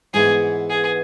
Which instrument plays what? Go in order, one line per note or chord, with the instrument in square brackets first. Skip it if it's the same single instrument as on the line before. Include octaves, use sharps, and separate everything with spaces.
[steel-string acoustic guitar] G#2 E3 B3 E4 [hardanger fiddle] G#4
[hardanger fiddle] G#4